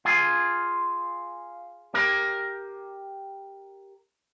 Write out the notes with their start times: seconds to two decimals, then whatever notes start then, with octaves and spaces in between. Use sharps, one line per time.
0.05 F4 G#4
1.94 G4 A#4